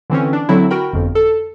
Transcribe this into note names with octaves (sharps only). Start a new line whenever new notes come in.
D3 E3 C4 C#4
D4
D3 F#3 C4 E4
F#4 A#4 G5 B5
G1 F2
A4